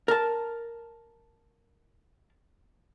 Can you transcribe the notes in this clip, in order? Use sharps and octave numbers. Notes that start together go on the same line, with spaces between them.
A#4 A5